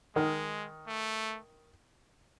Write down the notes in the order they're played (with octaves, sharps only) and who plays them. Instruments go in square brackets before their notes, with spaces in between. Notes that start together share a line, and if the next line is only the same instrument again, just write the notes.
[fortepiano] D#3 [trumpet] G#3
[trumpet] A3